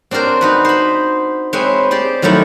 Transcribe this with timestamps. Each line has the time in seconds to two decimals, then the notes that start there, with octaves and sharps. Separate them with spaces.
0.11 C4 D4 F#4 A#4 C5
0.41 D#4 F#4 B4
0.65 C5 B5
1.53 G#3 C4 B4 C#5 E5
1.91 G4 C5 D5
2.22 D#3 F#3 G3 A3 E4